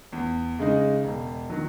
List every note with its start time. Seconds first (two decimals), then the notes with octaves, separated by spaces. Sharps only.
0.13 E2
0.59 C#3 G#3 D#4
1.04 E1
1.50 D#3 F#3